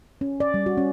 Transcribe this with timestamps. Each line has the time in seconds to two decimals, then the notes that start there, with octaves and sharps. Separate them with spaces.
0.21 C#4
0.40 D5
0.54 G3
0.66 F#4
0.78 C#4